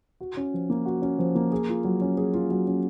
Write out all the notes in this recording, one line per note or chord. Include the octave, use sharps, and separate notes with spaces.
F#4
C#4
F3
A#3
F#4
C#4
F3
A#3
G#4
F4
F#3
C#4
G#4
F4
F#3
C#4